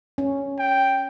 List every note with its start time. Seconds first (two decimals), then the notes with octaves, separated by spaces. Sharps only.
0.18 C#4
0.59 G5